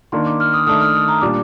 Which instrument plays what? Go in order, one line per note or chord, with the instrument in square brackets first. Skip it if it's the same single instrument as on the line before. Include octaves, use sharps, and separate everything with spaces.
[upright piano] D#3 A#3 D4 [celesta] C6
[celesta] D6
F6
D#6
[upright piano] D#3 A3 D4 [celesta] D#6
[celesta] F6
D#6
A#5
[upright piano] A#2 G3 D4 [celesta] D6